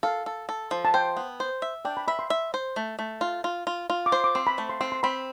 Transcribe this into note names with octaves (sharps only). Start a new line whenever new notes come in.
A4 F5
A4
A4
F3
A5
C5 G5
B3
C5
E5
D4 G5
B5
E5 B5
C6
E5
C5
A3
A3
F4
F4
F4
F4
D6
C5 C6
D6
C4 C6
B5
A3
C6
C4 C6
C6
C4 B5